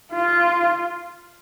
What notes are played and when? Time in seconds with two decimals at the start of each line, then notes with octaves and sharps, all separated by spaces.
0.13 F4